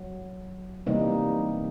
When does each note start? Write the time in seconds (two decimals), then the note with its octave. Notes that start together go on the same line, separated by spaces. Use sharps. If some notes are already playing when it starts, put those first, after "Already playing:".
Already playing: F#3
0.86 C3 E3 G3 A#3 D#4